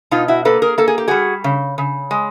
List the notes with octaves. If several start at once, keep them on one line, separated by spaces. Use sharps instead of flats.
B2 D#4 F4
E4 F#4
A#3 A4 B4
G#4 A#4
A#3 A4
G#4
G4
G3 F#4 G#4
C#3
C#3
G#3